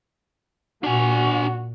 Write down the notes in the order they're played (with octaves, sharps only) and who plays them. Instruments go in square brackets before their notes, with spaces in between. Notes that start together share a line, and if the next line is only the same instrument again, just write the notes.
[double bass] A#2 [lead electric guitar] D4 G#5 [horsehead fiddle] F#4